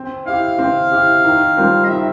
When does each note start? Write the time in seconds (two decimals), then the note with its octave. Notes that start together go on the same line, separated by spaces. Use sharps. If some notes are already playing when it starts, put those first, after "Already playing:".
Already playing: C4
0.26 E4 G4 F5
0.59 C4
0.92 E4 G4
1.24 D#3
1.57 G3 C4 F4 A#4
1.84 D#5
1.89 D#3 E5